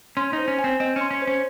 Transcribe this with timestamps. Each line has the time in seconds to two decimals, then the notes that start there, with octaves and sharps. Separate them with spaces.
0.17 C#4 C6
0.33 D#4
0.38 C5
0.48 C#4
0.59 G#5
0.64 C4
0.80 C4 D#5
0.96 C#4 C6
1.11 C#4
1.22 C5
1.27 C#4